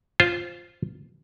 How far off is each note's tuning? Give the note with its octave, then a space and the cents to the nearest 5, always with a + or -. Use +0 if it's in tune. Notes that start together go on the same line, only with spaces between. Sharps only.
F4 +0 C5 +0